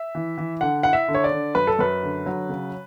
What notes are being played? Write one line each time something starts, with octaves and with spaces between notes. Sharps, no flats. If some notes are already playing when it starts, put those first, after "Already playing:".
Already playing: E5
E3
E3
D3 F#5
E4 F#5
E5
D3
C#5
D5
D3
F#2 B4
A4
F#2 B4
D3
F#3
C#3